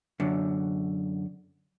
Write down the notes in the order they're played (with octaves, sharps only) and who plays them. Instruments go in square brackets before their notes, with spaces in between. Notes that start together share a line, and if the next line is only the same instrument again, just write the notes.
[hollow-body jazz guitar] F#2 D3